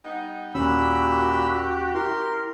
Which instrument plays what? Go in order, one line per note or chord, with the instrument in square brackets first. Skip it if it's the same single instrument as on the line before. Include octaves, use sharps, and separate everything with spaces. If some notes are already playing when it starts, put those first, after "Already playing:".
[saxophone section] G3 B3 D#4
[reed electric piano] D#2 C#4 [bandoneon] A#2 B5 E6 [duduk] F#4 [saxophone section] G4
[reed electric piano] E4 [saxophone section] G4 [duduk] A#4 [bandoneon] C6